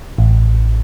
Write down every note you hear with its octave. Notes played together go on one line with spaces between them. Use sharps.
A1